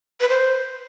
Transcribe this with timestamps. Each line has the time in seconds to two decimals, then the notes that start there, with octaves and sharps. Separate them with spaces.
0.21 B4
0.29 C5